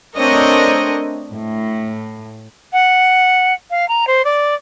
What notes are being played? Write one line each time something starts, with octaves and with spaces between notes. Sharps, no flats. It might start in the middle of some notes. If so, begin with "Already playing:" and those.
A3 C4 D4 A#4 C#5 D#5
A2
F#5
F5
A#5
C5
D5